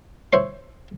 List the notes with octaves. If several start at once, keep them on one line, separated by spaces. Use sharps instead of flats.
E4 C5 C#5 C6